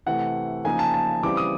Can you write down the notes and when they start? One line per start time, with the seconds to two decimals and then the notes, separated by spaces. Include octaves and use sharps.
0.06 C3 E3 A3 F#5
0.64 C#3 F3 A#3 D#4 G#5
0.79 A5
0.94 A5
1.23 C#3 E3 G3 C4 D6
1.37 D#6